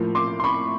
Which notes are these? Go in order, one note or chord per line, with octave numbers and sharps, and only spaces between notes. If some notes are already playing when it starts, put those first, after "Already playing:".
Already playing: A2 F3 A#3
C6 D6
C6
B5 C#6